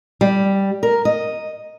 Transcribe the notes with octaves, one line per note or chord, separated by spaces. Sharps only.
G3
A#4
D#5